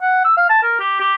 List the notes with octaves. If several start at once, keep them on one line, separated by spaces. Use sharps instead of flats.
F#5
E6
F5
A5
A#4
G4
G4